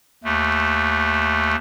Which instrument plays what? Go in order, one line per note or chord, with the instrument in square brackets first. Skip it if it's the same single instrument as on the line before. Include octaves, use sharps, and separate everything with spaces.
[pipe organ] D#2 A3